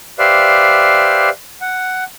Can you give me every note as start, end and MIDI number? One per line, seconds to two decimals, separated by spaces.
0.19 1.29 67
0.19 1.29 71
0.19 1.29 72
0.19 1.29 74
0.19 1.29 76
0.19 1.29 77
1.61 2.04 78